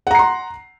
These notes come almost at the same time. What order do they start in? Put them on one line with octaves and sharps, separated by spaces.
F#5 A#5 C7 C6